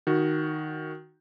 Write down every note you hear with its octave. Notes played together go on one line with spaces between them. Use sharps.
D#3 F#4